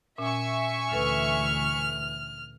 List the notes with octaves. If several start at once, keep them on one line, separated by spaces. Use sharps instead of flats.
A#2 C#4 E5 G#5 C#6
D2 E3 A4 B4 F6